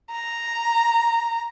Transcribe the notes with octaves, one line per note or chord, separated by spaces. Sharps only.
A#5